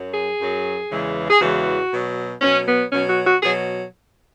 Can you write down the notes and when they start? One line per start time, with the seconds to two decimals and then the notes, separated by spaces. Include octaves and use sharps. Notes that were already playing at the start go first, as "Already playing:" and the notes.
Already playing: F#2 F#3
0.14 G#4
0.39 F#2 F#3
0.90 E2 C#3 E3 G#3
1.30 G#4
1.40 E2 C#3 E3 G#3 F#4
1.91 B2 F#3
2.42 B2 F#3 C#4
2.67 B3
2.92 B2 F#3 C#4
3.09 F#4
3.26 F#4
3.43 B2 F#3 G#4